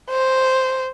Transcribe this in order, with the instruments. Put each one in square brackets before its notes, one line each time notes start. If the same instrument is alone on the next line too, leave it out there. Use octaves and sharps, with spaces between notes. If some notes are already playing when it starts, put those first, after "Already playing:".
[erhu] C5